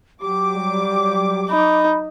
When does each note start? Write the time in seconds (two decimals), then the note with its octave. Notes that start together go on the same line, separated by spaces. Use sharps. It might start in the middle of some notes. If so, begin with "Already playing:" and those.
0.21 F#3 G4 D6
0.55 G3
1.50 D#4 B5